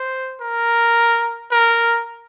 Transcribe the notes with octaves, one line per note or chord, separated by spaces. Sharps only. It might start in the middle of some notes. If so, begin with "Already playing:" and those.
Already playing: C5
A#4
A#4